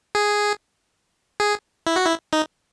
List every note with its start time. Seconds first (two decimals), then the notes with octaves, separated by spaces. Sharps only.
0.15 G#4
1.40 G#4
1.87 E4
1.96 F#4
2.06 E4
2.33 D#4